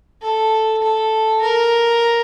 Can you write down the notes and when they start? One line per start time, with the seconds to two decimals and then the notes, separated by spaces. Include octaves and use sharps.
0.22 A4
0.82 A4
1.41 A#4